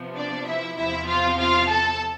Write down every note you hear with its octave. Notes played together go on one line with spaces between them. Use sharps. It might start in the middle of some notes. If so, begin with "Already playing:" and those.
Already playing: C3 F3 B3
D4 D5
E4 E5
E2 C3 F3 C4 E4 E5
F4 F5
F4 F5
A4 A5